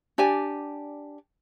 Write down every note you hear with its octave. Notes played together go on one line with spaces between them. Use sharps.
D4 G4 D5 G#5